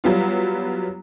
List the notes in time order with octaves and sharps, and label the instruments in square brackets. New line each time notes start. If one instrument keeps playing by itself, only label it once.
[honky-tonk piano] F#3 G3 B3 F4